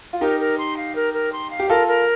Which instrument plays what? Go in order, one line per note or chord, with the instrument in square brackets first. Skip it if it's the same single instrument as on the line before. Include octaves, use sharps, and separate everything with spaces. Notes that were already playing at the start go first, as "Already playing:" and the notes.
[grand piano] F4
[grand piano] D#4 G4 [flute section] A#4
[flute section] A#4
C6
F5
A#4
A#4
C6
F5
[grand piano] G4
[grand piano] F4 A4 [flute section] A#4
[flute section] A#4